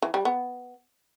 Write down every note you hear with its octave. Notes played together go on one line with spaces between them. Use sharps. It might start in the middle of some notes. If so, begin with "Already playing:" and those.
E3
G3
B3